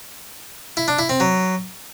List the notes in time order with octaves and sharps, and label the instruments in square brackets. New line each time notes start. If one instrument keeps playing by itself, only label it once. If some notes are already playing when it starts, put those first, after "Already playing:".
[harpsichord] E4
D4
E4
C4
F#3